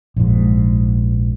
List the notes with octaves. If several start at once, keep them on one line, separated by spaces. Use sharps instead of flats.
A#1 G#2